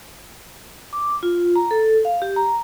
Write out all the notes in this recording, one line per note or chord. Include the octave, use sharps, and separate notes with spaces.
D6
F4
A#5
A4
F5
G4
A#5